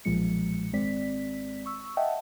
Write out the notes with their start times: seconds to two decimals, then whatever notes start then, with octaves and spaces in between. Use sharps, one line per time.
0.05 B1 A#2 F3 G#3 C#7
0.73 G#1 G#3 C4 D5 B6
1.66 C#6 E6
1.97 D#5 E5 F#5 G5 A5